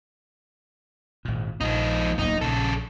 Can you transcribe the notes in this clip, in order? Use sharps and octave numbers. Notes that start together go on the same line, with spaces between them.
G#1 A#2
A#1 F3 D#4
D1 B1 A#3 D#4
A#1 C#3 A4